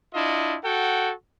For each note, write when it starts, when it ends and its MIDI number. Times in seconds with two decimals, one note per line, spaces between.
0.14 0.57 62
0.14 0.57 64
0.14 0.57 65
0.14 0.57 75
0.64 1.12 66
0.64 1.12 69
0.64 1.12 78
0.64 1.12 79